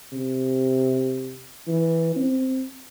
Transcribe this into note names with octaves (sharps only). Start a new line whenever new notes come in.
C3
E3
C4